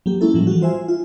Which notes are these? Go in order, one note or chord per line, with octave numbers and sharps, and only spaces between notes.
F#3 A#3 G4
G#3 A#3 C#4 E4 A4
A2 F3 G3
E3 G3 G#3 F#4
F4 C5 E5 G#5
F4